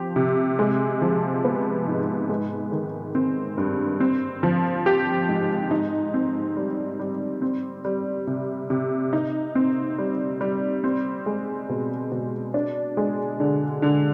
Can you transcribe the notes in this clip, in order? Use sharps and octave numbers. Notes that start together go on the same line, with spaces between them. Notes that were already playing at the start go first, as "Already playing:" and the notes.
Already playing: F3 C4 G4
C3
G#3
F3
B3
G#2
G#3
D#3
C4
G2
C4
F3
G4
G#2
D#4
C4
G3
G3
C4
G3
C3
C3
D#4
C4
G3
G3
C4
G#3
B2
B2
D4
G#3
D3
D3